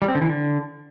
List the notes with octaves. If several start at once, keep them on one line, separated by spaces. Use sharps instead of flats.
G3
C4
D3
E3
D3